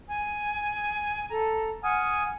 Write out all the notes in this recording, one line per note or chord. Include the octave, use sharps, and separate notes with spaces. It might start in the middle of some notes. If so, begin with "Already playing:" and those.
G#5
A4 A#5
F#5 G#5 D#6 F6